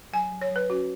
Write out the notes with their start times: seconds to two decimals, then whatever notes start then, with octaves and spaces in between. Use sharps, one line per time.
0.13 F#3 G#5
0.32 F#3
0.41 C#5
0.51 F#3 B4
0.70 C#4 F#4